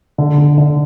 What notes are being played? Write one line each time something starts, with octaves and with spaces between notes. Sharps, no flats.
D3
D3
D3